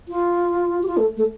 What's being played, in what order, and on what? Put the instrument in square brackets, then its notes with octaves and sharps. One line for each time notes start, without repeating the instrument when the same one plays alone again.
[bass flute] F4
G4
F4
A3
A3